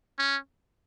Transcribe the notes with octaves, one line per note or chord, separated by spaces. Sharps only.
C#4